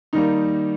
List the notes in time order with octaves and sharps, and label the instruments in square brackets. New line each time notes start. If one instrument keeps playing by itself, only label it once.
[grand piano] D#3 G3 A#3 D#4